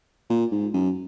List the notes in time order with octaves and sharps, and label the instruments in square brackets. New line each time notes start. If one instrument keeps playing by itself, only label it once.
[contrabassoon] A#2
G#2
F#2